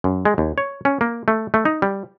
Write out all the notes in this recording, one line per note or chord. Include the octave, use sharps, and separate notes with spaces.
F#2
G#3
D#2
C#5
C#4
A#3
A3
A3
D#4
G3